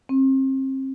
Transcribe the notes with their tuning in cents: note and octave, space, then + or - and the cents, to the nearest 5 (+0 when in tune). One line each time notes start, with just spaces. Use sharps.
C4 +35